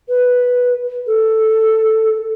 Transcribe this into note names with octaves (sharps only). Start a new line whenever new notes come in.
B4
A4